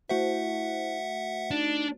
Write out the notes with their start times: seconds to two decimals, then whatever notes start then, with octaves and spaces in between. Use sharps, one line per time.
0.09 A3 E4 F#4 C5 E5 F#5
1.51 D4 D#4